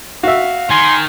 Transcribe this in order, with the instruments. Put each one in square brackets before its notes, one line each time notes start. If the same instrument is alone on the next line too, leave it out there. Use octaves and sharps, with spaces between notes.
[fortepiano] F#4 E5 [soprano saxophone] F5
[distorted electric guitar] D#3 [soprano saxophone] G#5 [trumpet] C6